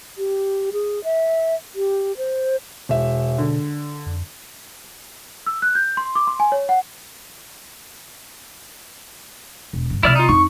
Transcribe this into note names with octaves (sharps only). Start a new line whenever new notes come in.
G4
G#4
E5
G4
C5
E1 B2 E5
D3
F2
E6
F#6
G6
C6
D6
C6
G#5
C#5
F#5
E1
G2 C#3
C3 F#3 E4 D5 F6
D#4 F4
F2 D#4 C#6